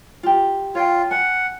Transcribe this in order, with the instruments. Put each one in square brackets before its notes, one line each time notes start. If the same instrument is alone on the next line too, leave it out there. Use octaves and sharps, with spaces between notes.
[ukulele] F4 G4
[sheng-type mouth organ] F4 [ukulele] C#5 G5
[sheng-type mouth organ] F#5 [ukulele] G#5